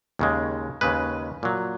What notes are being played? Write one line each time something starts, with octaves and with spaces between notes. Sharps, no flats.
D#2 C#3 G#3
D#2 C#3 G#3 B4
A#2 F#3